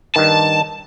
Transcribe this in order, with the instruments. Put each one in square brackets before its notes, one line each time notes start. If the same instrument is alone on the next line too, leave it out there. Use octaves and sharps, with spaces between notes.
[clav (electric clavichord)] G2 D#3 [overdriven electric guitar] A5